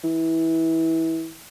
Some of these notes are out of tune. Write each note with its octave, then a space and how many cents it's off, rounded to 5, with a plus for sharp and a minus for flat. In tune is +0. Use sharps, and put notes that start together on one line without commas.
E3 -20